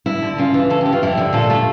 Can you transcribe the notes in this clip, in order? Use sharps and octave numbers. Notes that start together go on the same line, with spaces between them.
D2 E4
D3
C#3 F4
E3
C#3 A4
E3 G4
F4
F2 E4 G4
D3
A#2 F4 A4
A3